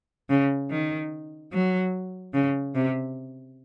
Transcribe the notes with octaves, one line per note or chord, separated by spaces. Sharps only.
C#3
D#3
F#3
C#3
C3